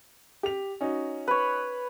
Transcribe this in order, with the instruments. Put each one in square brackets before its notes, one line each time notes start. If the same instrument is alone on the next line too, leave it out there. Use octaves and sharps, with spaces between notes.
[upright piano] G4 F7
C#4 D#4 F#4
[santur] B4 C#5